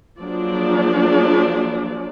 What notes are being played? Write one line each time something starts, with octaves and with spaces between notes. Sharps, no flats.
F3 F#3 A#3 D4 G#4 D5